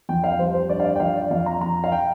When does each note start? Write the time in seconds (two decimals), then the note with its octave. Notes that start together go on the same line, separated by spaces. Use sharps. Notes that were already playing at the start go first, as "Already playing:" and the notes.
0.09 F2 G5
0.24 F5
0.39 G3 C5
0.54 C5
0.69 G2 D5
0.80 F5
0.85 D5
0.96 G5
1.00 F3 F5
1.16 D5
1.31 F2 F5
1.46 A#5
1.61 F2 A#5
1.84 F5
1.92 G5